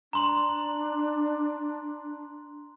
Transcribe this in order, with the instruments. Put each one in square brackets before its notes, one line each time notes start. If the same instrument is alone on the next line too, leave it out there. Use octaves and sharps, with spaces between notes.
[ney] D4 [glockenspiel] A#5 C6 F#7